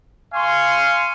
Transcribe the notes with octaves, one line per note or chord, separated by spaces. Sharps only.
F5 G#5 C6 C#6